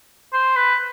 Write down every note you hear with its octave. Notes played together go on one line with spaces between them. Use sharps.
C5
B4